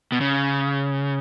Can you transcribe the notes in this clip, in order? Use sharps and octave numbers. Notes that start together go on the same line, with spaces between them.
B2
C#3